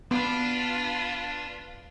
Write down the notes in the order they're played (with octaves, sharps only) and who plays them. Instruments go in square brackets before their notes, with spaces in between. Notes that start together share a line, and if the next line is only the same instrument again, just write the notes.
[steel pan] B3 B5 [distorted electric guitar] D4 [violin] F4 B4